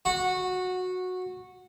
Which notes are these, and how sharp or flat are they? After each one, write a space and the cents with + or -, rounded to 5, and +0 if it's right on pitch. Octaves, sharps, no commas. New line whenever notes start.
F#4 -15